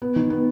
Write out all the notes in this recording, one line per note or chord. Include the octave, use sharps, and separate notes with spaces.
B3
D#3
B3